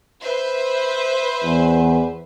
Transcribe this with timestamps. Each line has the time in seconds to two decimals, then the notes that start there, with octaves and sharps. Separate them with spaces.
0.22 B4 C5 E5
1.43 E2